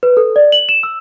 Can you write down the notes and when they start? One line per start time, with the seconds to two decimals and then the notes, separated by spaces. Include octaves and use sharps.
0.03 B4
0.17 A4
0.36 D5
0.52 F#7
0.69 E7
0.83 E6